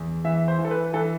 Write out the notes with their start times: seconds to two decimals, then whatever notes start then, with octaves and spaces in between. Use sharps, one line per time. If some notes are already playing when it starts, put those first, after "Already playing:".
Already playing: E2
0.24 E3 E5
0.48 C5
0.59 E3
0.65 A4
0.71 B4
0.93 E3 A4